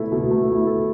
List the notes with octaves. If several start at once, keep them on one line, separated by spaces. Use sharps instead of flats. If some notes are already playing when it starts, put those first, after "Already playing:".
Already playing: B2 A3 E4 A4
B2
A3
E4
A4